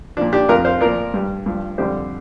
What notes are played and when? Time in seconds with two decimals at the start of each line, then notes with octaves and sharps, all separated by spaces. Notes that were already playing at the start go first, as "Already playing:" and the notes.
0.17 A#2 F3 D4
0.33 D4 G4
0.49 F2 F3 F4 A#4
0.65 C5 F5
0.81 A#2 F3 A#4 D5
1.14 G2 G3
1.46 G2 F3
1.78 F2 D3 G3 G4 C5